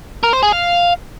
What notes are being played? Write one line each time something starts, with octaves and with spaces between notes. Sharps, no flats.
A#4
C5
G#4
F5